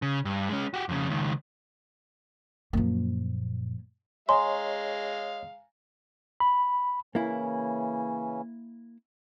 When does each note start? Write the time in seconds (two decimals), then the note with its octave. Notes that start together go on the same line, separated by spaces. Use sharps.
0.02 C#3
0.25 G2
0.49 G#3 C#4
0.74 F#4 G4
0.89 F2 C#3
1.09 C#2 D#3
2.73 F#2 A#2 F3 A#3
4.29 G#3 C#5 D#5 F5 G#5 A#5 C6
6.40 B5
7.15 C#3 E3 A#3 C#4 E4